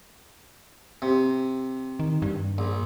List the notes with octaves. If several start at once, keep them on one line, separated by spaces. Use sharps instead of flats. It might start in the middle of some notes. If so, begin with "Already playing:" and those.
C3
D#3
G2
A#1